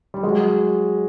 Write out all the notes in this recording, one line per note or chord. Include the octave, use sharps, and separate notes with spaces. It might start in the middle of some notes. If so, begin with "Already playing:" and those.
G3
F#3 G#3